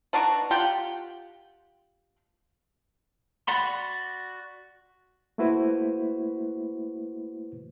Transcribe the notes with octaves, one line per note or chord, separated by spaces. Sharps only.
B3 D4 D#4 F#4
F4 G4 F#5 G5
F#4 D5 F#5 B5 C6
A3 A#3 E4 F#4 B4 C5